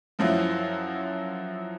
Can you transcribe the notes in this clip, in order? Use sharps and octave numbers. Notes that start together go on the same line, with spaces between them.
F#2 F3 F#3 E4